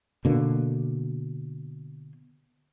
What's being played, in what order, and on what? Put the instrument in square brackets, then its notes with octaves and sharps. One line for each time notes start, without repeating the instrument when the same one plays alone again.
[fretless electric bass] B2 D3 A#3